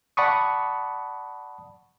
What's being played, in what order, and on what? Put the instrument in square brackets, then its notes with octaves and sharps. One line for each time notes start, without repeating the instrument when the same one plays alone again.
[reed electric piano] D5 F#5 A5 B5 C#6 D#6